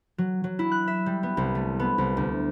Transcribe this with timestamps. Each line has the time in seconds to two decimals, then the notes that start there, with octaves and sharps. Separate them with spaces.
0.18 F#3
0.44 F#3
0.59 E4
0.72 F#6
0.88 E5
1.06 G3
1.23 B3
1.37 C2
1.55 A3
1.79 B3
1.98 C2
2.17 D2